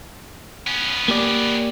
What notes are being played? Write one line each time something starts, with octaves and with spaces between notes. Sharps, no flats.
B3 C#4
A#3 G4 D5